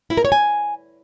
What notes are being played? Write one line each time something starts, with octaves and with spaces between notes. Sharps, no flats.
E4
A#4
C#5
G#5